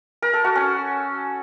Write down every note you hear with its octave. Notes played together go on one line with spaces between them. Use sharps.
A#4
A4
F#4
C#4